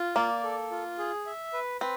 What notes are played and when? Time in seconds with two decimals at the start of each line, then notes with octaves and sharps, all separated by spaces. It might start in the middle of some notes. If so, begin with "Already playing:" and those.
Already playing: F4
0.16 A#3 D5
0.43 A4
0.71 F4
0.98 G#4
1.26 E5
1.53 B4
1.81 C4 B4